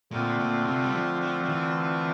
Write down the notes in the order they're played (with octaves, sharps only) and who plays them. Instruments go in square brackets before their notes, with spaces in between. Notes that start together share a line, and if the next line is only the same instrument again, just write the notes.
[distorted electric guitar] A#2 [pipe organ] D3 A3 C4 F4
[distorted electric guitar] A#2
C3
G3
F3
F3
F3
E3